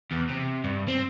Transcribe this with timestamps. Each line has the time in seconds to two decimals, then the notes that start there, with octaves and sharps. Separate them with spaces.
0.12 E2
0.30 C3
0.64 G2
0.88 C4